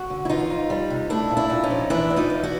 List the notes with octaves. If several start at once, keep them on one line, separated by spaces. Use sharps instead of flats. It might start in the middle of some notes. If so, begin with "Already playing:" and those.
Already playing: F#4
D3
E4
E3 D#4 F4
F2
G3
C3
A3 D4 E4
A#2
D4 E4
A#2
C#4 D#4
F3
E3 D4 E4
E2
D#4 F4
E2
E4 F#4